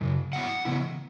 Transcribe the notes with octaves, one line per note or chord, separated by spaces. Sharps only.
F#2 C#3
G#2 F#3 B3 E4 F#5
C#3 E3 B3 E4